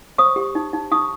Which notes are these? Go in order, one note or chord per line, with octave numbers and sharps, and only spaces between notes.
C5 C#6 D#6
G4
D#4
D#4
D#4 C#6 D#6